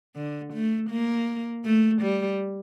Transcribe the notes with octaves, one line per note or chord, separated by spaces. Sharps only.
D3
A3
A#3
A3
G3